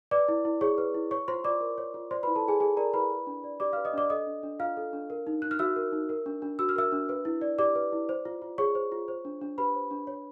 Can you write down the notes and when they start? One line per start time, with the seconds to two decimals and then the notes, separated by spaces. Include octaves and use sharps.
0.11 B4 D5 D6
0.28 E4
0.45 E4
0.61 G#4 C#5 C#6
0.78 B4
0.94 E4
1.11 C#5 C#6
1.28 F4 C5 C6
1.44 F4 D5 D6
1.61 A#4
1.78 C#5
1.94 F4
2.11 C5 D5 C6
2.23 E4 B4 B5
2.36 A4 A5
2.44 E4 G#4 G#5
2.60 G#4 A4 G#5
2.77 A#4 D5 A#5
2.94 E4 B4 B5
3.10 B4
3.27 D4
3.44 D5
3.60 G4 D5 D6
3.73 B4 F5 F6
3.85 D#5 D#6
3.93 D4 D5 D6
4.10 A4 D#5 D#6
4.27 D4
4.43 D4
4.59 F4 F5 F6
4.77 A4
4.93 D4
5.10 A#4
5.27 D#4
5.42 D#4 F#6
5.51 F6
5.59 F#4 E5 E6
5.76 A#4
5.92 D#4
6.09 A#4
6.26 D4
6.42 D4
6.59 F#4 E6
6.69 F6
6.76 A#4 E5 E6
6.92 D4
7.09 B4
7.25 E4
7.41 D5
7.59 G4 D5 D6
7.75 B4
7.92 E4
8.09 C5
8.25 F4
8.42 F4
8.58 G#4 C#5 C#6
8.75 C5
8.92 F4
9.08 C5
9.25 D4
9.41 D4
9.58 G4 B4 B5
9.75 C5
9.91 D4
10.07 C#5